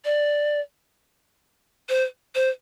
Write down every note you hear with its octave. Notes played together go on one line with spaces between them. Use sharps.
D5
C5
C5